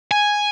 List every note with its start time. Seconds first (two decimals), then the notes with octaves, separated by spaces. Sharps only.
0.11 G#5